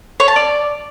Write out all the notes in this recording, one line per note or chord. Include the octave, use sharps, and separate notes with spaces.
C#5
A5
D5